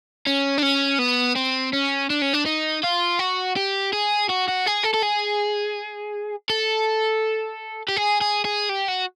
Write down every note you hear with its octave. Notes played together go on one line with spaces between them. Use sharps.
C#4
D4
C#4
B3
C4
C#4
D4
C#4
D4
D#4
F4
F#4
G4
G#4
F#4
F#4
G#4
A4
A4
G#4
A4
G4
G#4
G#4
G#4
G4
F#4